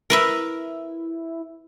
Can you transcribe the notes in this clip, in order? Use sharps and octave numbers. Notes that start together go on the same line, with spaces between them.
E4 A#4 B4 E5